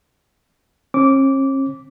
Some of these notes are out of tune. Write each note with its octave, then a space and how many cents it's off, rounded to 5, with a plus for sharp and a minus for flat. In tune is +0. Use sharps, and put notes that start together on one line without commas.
C#4 -45 D6 -15